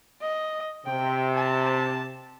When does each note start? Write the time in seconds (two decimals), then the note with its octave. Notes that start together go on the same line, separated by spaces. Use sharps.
0.21 D#5
0.86 C3 G5
1.36 A5